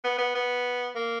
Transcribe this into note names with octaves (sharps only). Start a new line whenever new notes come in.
B3
B3
B3
A#3